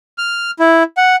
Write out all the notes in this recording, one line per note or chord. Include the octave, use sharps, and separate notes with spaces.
F6
E4
F#5